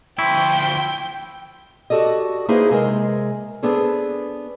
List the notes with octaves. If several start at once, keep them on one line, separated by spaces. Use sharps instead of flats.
D2 F3 E4 G5
F#4 G4 A4 D5 D#5
A#3 D#4 E4 G#4 B4 C5
C3 G#3 A#4
B3 C4 D4 G#4 A4